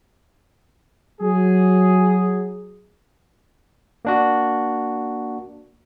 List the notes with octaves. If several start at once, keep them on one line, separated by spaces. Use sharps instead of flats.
F#3 G#4
A#3 D4 F#4